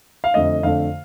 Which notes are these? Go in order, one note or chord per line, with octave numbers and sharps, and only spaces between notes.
F5
F2 D3 A3 D#5
F2 D3 A3 F5